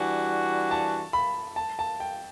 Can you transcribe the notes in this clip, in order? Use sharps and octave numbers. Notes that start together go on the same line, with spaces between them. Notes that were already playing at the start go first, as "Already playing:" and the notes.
Already playing: E3 G3 D4 F#4
A5
B5
A5
A5
G5